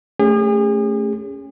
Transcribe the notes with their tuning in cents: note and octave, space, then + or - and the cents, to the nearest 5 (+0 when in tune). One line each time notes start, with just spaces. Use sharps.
A3 +5 C#4 +0 G#4 -40